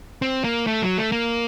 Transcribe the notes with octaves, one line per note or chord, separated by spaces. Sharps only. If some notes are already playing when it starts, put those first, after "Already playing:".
C4
A#3
A3
F#3
A3
A#3